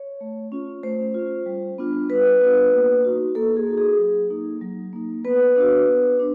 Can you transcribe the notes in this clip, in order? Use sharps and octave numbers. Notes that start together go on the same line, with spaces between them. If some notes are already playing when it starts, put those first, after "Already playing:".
Already playing: C#5
A3
C#4 F4
A3 C5
C#4 F4
G3
B3 D4 F4
G3 B4
B3 D4 F4
A#3
D#4 F#4
A#3 A4
G#4
D#4 F#4
G#4
F#3
A#3 D#4
F#3
A#3 D#4
B3 B4
D4 F#4
B3
D4